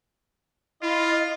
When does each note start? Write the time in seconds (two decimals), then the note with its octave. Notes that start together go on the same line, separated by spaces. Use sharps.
0.82 E4 F4 D#5